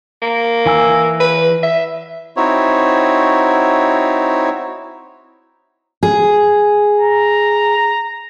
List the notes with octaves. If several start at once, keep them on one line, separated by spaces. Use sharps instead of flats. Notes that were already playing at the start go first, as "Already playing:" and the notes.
A#3
E3 G#5 E6
B4
E5
C4 D#4 E4 F#4 C#5
G#4
A#5